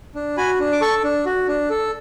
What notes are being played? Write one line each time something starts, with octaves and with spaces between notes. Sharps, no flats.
D4
F#4 G#5 B5
D4
D6
A4 A5 C#6
D4
F#4
D4
A4